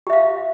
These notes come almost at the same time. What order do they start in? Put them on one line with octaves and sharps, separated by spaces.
G4 E5 F5